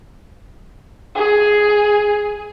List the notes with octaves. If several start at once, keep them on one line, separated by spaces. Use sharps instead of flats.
G#4